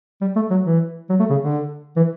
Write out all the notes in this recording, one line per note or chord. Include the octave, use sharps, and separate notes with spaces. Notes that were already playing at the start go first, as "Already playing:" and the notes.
G3
A3
F#3
E3
F#3
A3
C#3
D3
E3